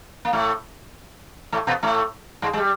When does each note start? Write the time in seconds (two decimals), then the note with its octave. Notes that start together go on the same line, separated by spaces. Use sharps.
0.25 A#3
0.33 A2 A3
1.52 A2 A3
1.67 B2 B3
1.83 A2 A3
2.42 G#2 G#3
2.53 G#3
2.57 G3